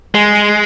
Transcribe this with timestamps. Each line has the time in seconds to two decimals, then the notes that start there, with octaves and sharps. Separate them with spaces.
0.15 G#3